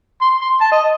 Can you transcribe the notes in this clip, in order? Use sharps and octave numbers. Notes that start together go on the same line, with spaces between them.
C6
C6
A5
D#5